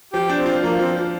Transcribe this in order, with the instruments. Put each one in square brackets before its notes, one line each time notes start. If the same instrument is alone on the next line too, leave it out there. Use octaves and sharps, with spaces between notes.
[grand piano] F3 [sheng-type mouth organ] G4
[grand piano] D4
[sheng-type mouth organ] C4
[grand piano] F4
[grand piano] F3 [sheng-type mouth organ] A#3
[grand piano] F3 [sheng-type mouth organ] C4
[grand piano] F3